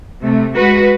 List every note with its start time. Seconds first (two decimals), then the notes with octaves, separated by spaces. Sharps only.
0.22 C3 A3
0.55 G#3 F#4 B4